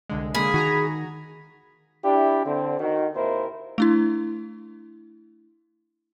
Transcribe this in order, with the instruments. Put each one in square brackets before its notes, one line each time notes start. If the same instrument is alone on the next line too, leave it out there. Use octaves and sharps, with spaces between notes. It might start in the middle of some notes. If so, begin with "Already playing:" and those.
[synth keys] C2 D3 G#3
[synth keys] D3 G#3 A#3 [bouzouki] G#4 [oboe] B5
[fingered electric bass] D#3 [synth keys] F#4 G#5 A#5
[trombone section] D4 E4 G4
D3 C4
D#3 F#4
D#2 A#2 C4 E4 A#4 C5
[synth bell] A3 D4 E4